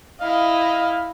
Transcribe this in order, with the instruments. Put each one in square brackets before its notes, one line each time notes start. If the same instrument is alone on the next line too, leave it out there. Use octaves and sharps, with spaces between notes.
[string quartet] E4 D#5 [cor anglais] F5